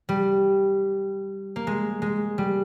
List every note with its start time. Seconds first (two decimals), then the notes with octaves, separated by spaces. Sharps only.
0.09 G3
1.56 A#3
1.67 G#3
2.02 G#3
2.38 G3